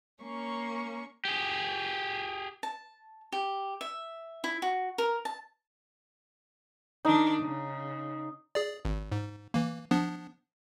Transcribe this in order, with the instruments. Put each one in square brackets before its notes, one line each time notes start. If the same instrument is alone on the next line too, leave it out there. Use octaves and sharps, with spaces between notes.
[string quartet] A#3 C#4 C#6
[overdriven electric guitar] G4 G#4
[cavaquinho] A5
G4
E5
E4
F#4
A#4
A5
[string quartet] D#3 D4 [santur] D#4
[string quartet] C#3
[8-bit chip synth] G#4 D5
G#1
G#2
E3 A#3
F3 B3 D4